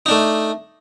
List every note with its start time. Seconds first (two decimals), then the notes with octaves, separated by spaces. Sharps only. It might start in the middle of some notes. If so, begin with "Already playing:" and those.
0.06 D#4
0.09 D4
0.11 A3